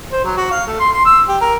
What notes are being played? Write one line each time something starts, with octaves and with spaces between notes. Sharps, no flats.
C5
F#3
F#4
F5
A3
C6
C6
E6
G4
A#4